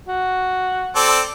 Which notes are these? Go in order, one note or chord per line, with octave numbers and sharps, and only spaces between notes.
F#4
C4 A4 D5